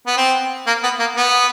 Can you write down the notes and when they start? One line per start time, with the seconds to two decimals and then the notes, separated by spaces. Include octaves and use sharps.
0.07 B3
0.17 C4
0.66 A#3
0.83 B3
0.99 A#3
1.16 B3